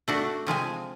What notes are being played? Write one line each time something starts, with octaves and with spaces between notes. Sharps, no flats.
A3 D4 F#4
C3 F3 G#3 G#5